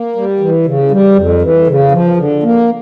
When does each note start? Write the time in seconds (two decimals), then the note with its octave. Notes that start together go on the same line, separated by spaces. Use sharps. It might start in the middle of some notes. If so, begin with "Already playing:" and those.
Already playing: A#3
0.16 G3
0.40 E3
0.66 C#3
0.91 G3
1.16 F2
1.42 E3
1.67 C#3
1.91 F3
2.17 D3
2.43 A#3